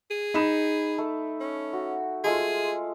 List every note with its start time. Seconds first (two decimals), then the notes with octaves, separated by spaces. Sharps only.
0.11 G#4
0.34 D#4 B5 E7
0.98 A3
1.40 C#4
1.73 F#4
2.24 G#3 A3 F4 G#4